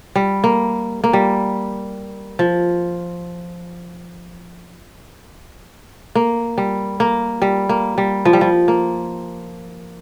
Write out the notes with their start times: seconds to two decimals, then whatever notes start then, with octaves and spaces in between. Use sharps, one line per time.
0.15 G3
0.44 A#3
1.04 A#3
1.13 G3
2.39 F3
6.15 A#3
6.58 G3
7.00 A#3
7.42 G3
7.69 A#3
7.98 G3
8.25 F3
8.33 G3
8.41 F3
8.68 A#3